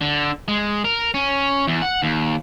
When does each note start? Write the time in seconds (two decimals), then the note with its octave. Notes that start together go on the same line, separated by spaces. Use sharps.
0.01 D3
0.48 G#3
0.84 A#4
1.14 C#4
1.67 E2
1.82 F#5
2.03 D#2